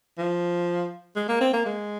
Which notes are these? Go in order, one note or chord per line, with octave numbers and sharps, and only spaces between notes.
F3
G#3
A#3
C4
A#3
G#3